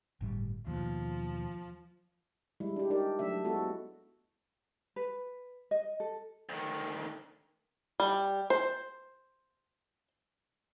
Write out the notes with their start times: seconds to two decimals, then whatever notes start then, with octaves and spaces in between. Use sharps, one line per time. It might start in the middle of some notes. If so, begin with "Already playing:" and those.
0.21 G1 A2 G3
0.67 D#2 B2 F3
2.60 G3 G#3 E4
2.76 D4 G4
2.90 D4 D#4 G4 A#4 D5
3.19 F#3 A3 D4 E5
3.45 G#3 B3 E4 F#4 A4
4.96 B4
5.71 D#5
6.00 A4
6.49 D2 D#3
8.00 G3
8.50 C5